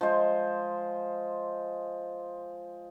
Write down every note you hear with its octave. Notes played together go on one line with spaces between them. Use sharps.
F3 G#3 C5